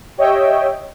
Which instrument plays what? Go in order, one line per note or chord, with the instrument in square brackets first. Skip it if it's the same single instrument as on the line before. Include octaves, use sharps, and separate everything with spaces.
[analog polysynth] G4 C#5 D#5 E5 G5